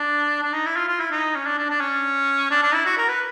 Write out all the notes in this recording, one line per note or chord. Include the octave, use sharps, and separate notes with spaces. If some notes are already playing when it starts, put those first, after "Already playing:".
Already playing: D4
D4
D#4
E4
F4
F4
E4
D#4
C#4
D4
D4
D4
C#4
D4
D4
E4
F#4
A#4
B4